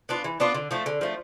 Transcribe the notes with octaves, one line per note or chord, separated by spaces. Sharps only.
B3 D4 F4
E3
B3 D4 F4
D3
F3 A3
D3
F3 A3